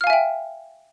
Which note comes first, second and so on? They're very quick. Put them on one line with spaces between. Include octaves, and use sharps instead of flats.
F6 F5 G#5 E5 G5